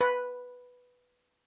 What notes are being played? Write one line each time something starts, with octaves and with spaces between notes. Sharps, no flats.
B4